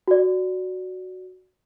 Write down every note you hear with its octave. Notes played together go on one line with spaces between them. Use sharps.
F#4 D5